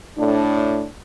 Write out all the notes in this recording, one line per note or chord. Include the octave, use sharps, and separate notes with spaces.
A2 D4